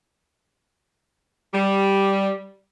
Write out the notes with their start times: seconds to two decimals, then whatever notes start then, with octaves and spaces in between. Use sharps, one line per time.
1.54 G3